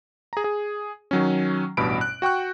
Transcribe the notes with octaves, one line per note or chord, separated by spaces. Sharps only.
G#4 A#5
G#4
D#3 F#3 C#4
A1 G2 B2 B5 D7
F#6
F#4 G5 C#6 F#6